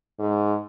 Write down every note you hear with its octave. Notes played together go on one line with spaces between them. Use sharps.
G#2